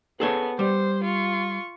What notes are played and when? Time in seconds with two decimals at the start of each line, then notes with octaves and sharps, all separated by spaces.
0.20 B3 G#4 A4 C#5
0.59 G3 C5
1.04 F4 C#6